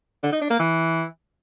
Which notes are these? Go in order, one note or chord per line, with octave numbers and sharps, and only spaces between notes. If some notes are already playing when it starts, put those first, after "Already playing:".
D3
D#4
D4
A#3
E3